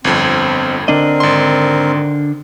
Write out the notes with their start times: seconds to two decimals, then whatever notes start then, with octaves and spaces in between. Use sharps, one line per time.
0.04 G1 F2 C4
0.88 D3 C4 D4 A#4 D#5
1.20 G#1 C6